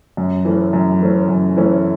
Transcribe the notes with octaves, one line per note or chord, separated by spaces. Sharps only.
F#2
E3 A3 C#4
F#2
E3 A3 C#4
F#2
E3 A3 C#4